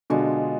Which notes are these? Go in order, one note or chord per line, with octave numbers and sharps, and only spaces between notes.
B2 D3 G#3 D4 F4